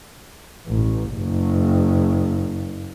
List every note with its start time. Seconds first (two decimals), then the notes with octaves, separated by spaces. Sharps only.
0.66 A1
1.12 F#1